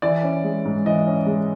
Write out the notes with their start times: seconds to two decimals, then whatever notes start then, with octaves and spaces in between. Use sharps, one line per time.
0.02 E3 D5
0.23 C#4
0.44 G#3
0.65 G#2
0.86 E3 D#5
1.07 C#4
1.26 G#3